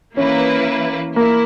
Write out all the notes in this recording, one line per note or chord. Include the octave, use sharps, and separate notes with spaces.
E3 A#3 C#4 E4 B4
A#3 E4